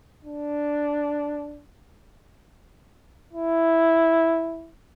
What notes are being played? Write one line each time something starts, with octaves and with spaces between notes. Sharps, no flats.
D4
E4